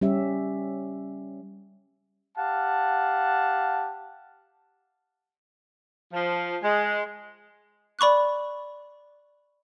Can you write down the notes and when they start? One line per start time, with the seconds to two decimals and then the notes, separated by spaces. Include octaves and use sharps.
0.01 G3 C#4 G4 E5
2.37 G4 F5 F#5 A5
6.13 F3
6.62 G#3
7.99 D5 B5 C#6 D6 F#6